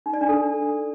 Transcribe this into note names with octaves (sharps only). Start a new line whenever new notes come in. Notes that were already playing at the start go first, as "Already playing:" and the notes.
D#4
D5
D4
A4